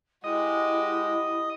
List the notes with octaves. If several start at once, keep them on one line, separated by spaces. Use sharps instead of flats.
G#3 E4 F#4 G4 D#5